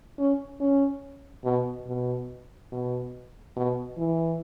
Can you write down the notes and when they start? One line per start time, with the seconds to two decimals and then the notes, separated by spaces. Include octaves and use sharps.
0.19 C#4
0.60 C#4
1.44 B2
1.87 B2
2.72 B2
3.56 B2
3.98 E3